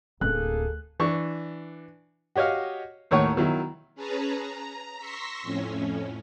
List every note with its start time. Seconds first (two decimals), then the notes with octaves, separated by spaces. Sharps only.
0.21 D1 A#3 G#4 A4 F#6
1.00 E3 D4 C#6
2.36 F#4 G4 C#5 D#5 F5
3.11 D#2 A2 D#3 C#5 F#5 C#6
3.36 B2 D#3 F#3 E4
3.95 C#4 G#4 B4 A5 A#5
4.39 A#5
4.96 C6 C#6 E6 A#6 B6
5.43 F2 A2 C#4